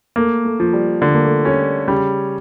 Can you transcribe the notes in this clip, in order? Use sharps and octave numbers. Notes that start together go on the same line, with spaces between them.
A3 A#3
A3
F3
G3
D3 A3
A#3
A3
G3 C#4
C#3 G3